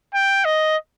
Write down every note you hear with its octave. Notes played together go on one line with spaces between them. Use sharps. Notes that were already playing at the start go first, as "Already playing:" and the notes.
G5
D#5